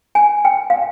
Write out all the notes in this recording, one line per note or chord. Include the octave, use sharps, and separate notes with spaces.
G#5
G5
F5